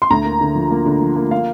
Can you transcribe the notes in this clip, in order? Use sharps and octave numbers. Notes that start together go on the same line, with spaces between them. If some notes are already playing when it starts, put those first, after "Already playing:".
C6
D2 A#5
A#3
D3
F3
A#3
D3
F3
A#3
A#3 F5